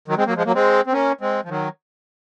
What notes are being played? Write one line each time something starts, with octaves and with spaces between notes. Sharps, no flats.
D#3 F#3
G#3 C4
F#3 A#3
F3 G#3
F#3 A#3
G#3 C4
C4
A#3 C#4
G#3 C4
F3
D#3 F#3